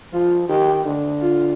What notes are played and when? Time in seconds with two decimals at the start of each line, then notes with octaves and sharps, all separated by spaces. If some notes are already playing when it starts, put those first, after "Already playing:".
0.13 F3 F4
0.49 D#3 G4
0.85 D3
1.21 F4